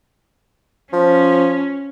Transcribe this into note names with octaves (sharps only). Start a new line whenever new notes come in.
F3 C#4